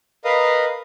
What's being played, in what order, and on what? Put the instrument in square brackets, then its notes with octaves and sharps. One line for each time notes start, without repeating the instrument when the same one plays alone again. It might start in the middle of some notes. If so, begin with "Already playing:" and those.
[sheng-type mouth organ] A#4 B4 D#5 F5 D#6